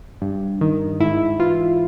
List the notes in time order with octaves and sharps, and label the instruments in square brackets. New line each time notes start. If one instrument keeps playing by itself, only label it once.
[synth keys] G2
D#3
G#2 E4
E3 F4